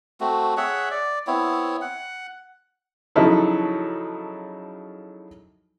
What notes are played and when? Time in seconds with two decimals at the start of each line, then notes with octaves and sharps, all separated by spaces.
0.20 A3 C4 F#4
0.57 G#4 C#5 E5 F#5
0.91 D5
1.27 B3 C4 E4 C#5
1.81 F#5
3.16 C#3 F3 F#3 D#4 E4 A4